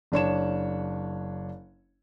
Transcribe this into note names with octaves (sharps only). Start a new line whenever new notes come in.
F#1 D4 C#5 E7